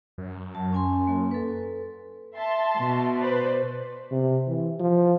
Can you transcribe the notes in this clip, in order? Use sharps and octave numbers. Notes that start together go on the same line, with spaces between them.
F#2
F#3 A5
C#4 G#5 C6
A#3
A4 B4
E5 A5 C6
B2
B4 C5 D5
C3
E3
F3